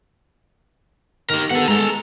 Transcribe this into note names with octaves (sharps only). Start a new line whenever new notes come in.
D#3 G4 A#4
B3 G4 A4 A#4 F#5
G#3 A3 A4 A#5